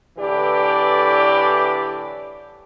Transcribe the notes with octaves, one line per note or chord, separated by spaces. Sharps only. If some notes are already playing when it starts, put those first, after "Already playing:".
A2 D3 E3 G4 B4 D5